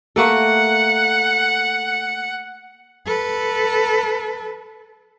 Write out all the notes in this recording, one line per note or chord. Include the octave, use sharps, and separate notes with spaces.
A3 A#3 A4 F#5
A4 B4